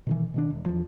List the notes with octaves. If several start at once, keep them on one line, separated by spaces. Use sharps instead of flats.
B2 D#3 E3
B2 D#3 D4
E1
E2 F3